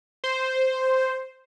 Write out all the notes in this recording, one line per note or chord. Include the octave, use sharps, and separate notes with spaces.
C5